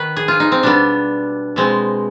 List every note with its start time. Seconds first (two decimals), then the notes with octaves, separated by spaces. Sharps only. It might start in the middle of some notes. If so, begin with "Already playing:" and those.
Already playing: D#3 B3 B4
0.16 G#4
0.28 F4
0.40 D#4
0.52 C4
0.63 B2 G3 B3 D4
1.56 B2 G#3 C4